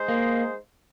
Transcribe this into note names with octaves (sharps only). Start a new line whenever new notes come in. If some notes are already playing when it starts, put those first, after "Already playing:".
Already playing: G#3 D#4 C5
A#3